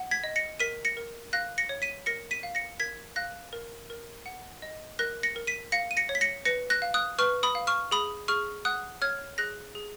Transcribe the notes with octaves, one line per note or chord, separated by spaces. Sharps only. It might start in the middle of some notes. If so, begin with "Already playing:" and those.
Already playing: F#5
G#6 B6
D#5
A#6 C#7
A#4 B6 D#7
A#6 C#7
A#4
F5 F#6 A#6
A#6 C#7
C#5
B6 D#7
A#4 A#6 C#7
B6 D#7
F5
A#6 C#7
A#4 G#6 B6
F5 F#6 A#6
A#4
A#4
F#5
D#5
A#4 F#6 A#6
A#6 C#7
A#4
B6 D#7
F5 A#6 C#7
D#7
A#6 C#7
C#5
B6
A#6 C#7
B4 A#6 C#7
F#6 A#6
F5
D#6 F#6
B4 C#6 F6
B5 D#6
F5
C#6 F6
G#4 B5 D#6
G#4 C#6 F6
F#5 D#6 F#6
C#5 F6 G#6
G#4 F#6 A#6
G#4